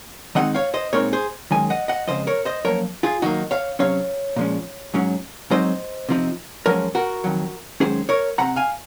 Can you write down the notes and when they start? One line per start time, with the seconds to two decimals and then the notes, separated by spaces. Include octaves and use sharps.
0.35 D#3 G#3 C4 D#4 D#5 F#5
0.55 C#5 F5
0.74 C5 D#5
0.93 A#2 G#3 C4 D#4 A#4 C#5
1.13 G#4 C5
1.51 F#2 D#3 G#3 G#5
1.70 D#5 F#5
1.88 D#5 F#5
2.07 F2 C#3 G#3 C5 D#5
2.27 A#4 C#5
2.45 C5 D#5
2.65 F#2 F3 A#3 A#4 C#5
3.03 F4 G#4
3.22 D#3 F#3 A#3 D#4 F#4
3.51 C#5 F5
3.79 C3 F#3 C#4 C#5 F5
4.36 A#2 F3 G#3 C#4
4.94 G#2 F#3 C#4
5.51 G#2 F#3 C4 D#4 C5 D#5
6.09 C3 F3 C4 D#4
6.66 F#2 F3 G#3 C#4 A#4 C#5
6.95 F#4 A#4
7.24 F2 D#3 F#3
7.80 F#2 D#3 G#3 C#4 G#4 C5
8.09 A#4 C#5
8.38 C3 F3 C4 F#5 A#5
8.56 F5 G#5